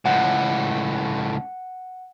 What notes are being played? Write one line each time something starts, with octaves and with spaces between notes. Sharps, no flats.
C#2 A2 F#5